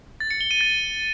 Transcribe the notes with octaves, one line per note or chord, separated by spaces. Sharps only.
A6
C#7
G7
D#7
A6